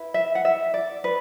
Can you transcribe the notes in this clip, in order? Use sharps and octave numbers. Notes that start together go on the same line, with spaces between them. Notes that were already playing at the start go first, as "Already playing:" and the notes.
Already playing: E4 B4
E5
F#5
E5
D5
B4